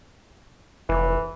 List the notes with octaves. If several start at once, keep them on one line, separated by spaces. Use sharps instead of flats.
F1 E3